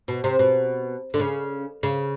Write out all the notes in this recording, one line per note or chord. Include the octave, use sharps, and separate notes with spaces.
B2
C3
B2
D3
C#3
C#3